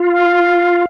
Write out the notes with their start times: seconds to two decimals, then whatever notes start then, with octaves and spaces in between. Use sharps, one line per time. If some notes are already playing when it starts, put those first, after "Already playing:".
Already playing: F4
0.12 F5